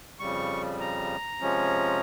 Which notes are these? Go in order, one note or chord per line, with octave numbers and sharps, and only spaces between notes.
F2 C#3 G3 C#6
A#5
C3 F3 G#3 C#4